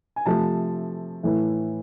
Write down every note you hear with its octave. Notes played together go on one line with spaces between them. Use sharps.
G#5
C3 F3 A3 A5
A2 E3 A3